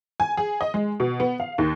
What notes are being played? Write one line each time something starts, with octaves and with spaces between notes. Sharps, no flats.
G#5
G#4
D#5
G#3
B2
B3
F5
D#2